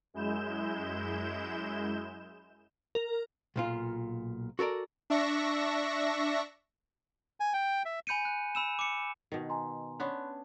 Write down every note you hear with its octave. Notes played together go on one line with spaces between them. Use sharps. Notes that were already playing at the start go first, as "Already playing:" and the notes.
F#2 G#3 E4 G6 E7
A#4
B1 A#2 F4
F#4 A4 A#4 D5
D4 E5 C#6 A#6
G#5
G5
E5
G#5 B5 G6 C#7 D#7
F#6
B5 E6 E7
D6 C#7
B2 D#3
G#5 A#5 C6
B3 C#4 D4 B5 C6 F#6